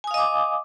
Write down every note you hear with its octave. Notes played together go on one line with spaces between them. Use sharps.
D#5 F5 G#5 D6 D#6